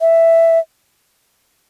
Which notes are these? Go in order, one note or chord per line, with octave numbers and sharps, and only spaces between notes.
E5